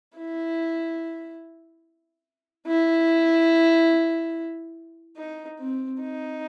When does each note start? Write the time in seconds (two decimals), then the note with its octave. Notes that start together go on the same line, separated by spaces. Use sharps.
0.16 E4
2.67 E4
5.17 D#4
5.59 C4
6.01 D#4